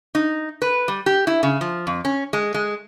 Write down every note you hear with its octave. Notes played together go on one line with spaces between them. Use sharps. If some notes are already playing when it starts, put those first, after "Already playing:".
D#4
B4
G3
G4
E4
C#3
F3
F2
C#4
G#3
G#3